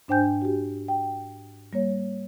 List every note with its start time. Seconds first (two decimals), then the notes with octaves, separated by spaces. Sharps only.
0.08 G#2 D4 C5 G5 G#5 G6
0.42 F#4 G4
0.88 G5
1.73 G3 A#3 C#5